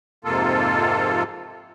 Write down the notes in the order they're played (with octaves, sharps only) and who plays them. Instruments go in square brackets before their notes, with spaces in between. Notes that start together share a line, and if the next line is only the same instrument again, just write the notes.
[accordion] F2 G#2 C3 A#3 F4 A4